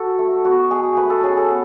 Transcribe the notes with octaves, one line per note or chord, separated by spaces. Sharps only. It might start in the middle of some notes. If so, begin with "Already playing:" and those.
Already playing: F#4 A4
A3
B3 F#4
G#3 G#4
A3 B4
A4
C#4 G#4
A4
B3